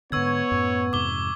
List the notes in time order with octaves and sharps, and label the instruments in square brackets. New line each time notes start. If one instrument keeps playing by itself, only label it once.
[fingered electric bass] G#2 D3 [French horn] B3 [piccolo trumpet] C#5 [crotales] C#6 E6 G#6
[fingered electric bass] F#2 A2
[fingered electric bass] F2 G#2 C3 [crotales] D6 G7